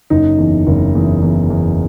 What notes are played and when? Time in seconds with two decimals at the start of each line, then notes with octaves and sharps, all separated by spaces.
0.10 F#1 D#4
0.38 E2
0.67 F#1
0.95 E2
1.22 E2
1.50 E2